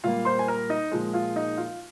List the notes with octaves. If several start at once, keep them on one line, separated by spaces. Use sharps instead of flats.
A#2 G3 A#3 F4 F5
C5 C6
G#5
A#4 A#5
D#4 D#5
A#2 F3 G#3
F4 F5
D#4 D#5
F4 F5